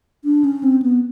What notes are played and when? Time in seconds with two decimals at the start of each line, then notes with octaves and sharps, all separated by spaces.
0.25 D4
0.44 C#4
0.63 C4
0.82 B3